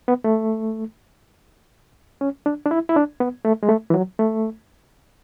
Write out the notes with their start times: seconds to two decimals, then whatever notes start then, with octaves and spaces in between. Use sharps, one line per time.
0.08 B3
0.24 A3
2.21 C#4
2.46 D4
2.66 D4
2.71 E4
2.89 E4
2.96 D4
3.20 B3
3.45 A3
3.63 G#3
3.69 A3
3.90 E3
3.94 F#3
4.19 A3